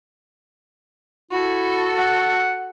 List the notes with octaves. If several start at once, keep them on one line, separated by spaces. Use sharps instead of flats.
E4 F#4 A4
F#5